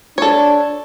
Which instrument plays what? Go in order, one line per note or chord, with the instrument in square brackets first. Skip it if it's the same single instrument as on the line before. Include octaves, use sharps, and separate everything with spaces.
[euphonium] D4 [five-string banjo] A4 C#5